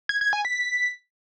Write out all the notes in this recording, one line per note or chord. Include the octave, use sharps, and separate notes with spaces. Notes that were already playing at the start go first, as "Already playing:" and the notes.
G#6
G#6
G#5
B6